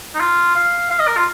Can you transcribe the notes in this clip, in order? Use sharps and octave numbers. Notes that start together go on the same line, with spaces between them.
D#4
F4
F5
F5
D#5
A#4
F4